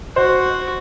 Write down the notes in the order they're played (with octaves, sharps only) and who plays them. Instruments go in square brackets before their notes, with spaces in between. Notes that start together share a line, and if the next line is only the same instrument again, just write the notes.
[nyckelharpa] F#4 F#5 [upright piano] C5